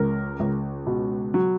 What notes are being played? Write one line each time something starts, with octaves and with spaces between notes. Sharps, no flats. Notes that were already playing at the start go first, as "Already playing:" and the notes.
Already playing: C#2 A#4
C#2
B2
F#3